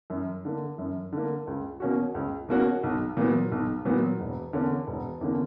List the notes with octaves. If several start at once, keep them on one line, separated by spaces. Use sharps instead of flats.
F#2
D3 A#3
F#2
D3 A#3
C#2
B2 A#3 C#4 F#4
C#2
B2 A#3 C#4 F#4
B1
A#2 F#3 B3
B1
A#2 F#3 B3
E1
E2 D3 A#3 C#4
E1
E2 D3 A#3 C#4